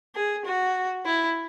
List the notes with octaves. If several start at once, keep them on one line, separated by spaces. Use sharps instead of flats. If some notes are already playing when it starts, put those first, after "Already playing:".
G#4
F#4
E4